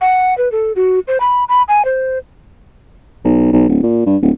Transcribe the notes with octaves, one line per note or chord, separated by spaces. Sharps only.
F#5
B4
A4
F#4
C5
B5
B5
G#5
C5
B1
B1
D1
A#2
G2
D1